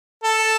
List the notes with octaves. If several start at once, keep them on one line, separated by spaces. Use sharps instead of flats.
A4